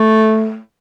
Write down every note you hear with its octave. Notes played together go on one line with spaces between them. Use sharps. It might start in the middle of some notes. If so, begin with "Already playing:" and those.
Already playing: A3